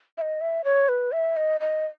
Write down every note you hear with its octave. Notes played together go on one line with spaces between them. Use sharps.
E5
D#5
E5
C#5
B4
E5
D#5
D#5